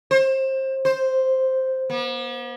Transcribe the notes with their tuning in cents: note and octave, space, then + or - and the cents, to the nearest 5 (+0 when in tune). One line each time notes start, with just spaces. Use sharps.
C5 +25
C5 +0
B3 -45